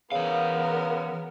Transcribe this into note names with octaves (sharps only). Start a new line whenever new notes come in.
C#3 E3 B3 A#4 F5